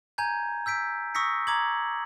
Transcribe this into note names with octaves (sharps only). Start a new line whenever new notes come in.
G#5 A#5 G6 G#6
E6 G6 B6 D7
C#6 D#6 E6 A#6 B6 C#7
A#5 D6 G#6 F#7